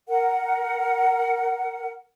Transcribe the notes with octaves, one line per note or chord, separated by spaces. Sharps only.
A#4 F#5